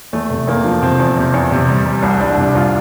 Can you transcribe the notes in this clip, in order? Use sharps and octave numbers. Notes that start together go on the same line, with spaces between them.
E2 A3
C3
E2 A#3
F3
C3 C4
E2
C3
E2
C3
G3
G3
C2
C2 D4
C3
C2 F4